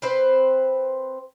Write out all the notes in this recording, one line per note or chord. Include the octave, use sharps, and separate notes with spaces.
C4 B4 C5